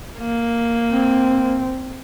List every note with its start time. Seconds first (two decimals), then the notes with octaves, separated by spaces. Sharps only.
0.19 A#3
0.92 C4